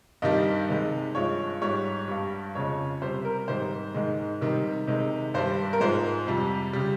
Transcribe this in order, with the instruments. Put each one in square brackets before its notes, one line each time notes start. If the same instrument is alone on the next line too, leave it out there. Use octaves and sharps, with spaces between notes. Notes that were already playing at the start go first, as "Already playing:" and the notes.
[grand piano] G2 D#3 G3 D#5
C3 D#3 G#3
G2 F3 G#3 C#5
G#2 G3 C#5
G2 G3
F2 C#3 F3 G#3 C#5
C3 G3 C5
A#4
G#2 D#3 G3 C5
G#2 D#3 G#3
C3 D#3 G3
C3 D#3 G#3
G2 G3 C5
A#4
G#2 F3 G#3 C5
F2 C3 G3
C#3 G3